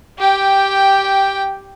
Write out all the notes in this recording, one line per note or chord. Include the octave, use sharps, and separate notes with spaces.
G4 G5